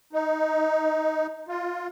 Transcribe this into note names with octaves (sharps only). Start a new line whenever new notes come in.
D#4
F4